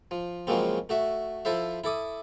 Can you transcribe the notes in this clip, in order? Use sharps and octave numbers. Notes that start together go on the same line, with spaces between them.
F3
C#3 F3 F#3 G#3 A#3 C4
A3 F#4 E5
F3 E4 A4 C5 E5
E4 A4 D6 D#6